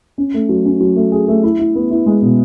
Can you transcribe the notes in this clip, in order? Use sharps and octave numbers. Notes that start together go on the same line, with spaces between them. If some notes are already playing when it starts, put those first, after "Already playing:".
C#4
A3
F#3
C#4
F#3
A3
G#4
A3
E4
E4
B3
E4
G#3
B2